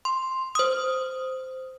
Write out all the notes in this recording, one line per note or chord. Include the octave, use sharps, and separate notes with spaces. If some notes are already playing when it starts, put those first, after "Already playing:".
C6
C5 D#6